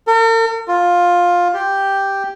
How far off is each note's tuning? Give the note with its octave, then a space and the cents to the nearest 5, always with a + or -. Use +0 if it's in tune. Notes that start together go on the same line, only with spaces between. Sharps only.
A#4 -45
F4 +10
G4 +0